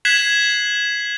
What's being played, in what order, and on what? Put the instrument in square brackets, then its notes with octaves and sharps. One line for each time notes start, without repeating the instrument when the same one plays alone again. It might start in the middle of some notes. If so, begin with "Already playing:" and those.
[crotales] F#6 G#6 B6 C7 E7 F#7